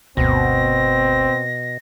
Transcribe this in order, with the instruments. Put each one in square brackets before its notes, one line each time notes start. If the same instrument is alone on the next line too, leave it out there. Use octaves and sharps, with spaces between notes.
[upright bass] G1 D2 [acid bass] B2 [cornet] C4 [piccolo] A#6